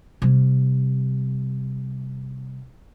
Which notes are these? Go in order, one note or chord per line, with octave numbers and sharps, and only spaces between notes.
C3 G3